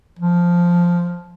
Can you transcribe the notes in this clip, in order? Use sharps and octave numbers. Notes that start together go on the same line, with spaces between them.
F3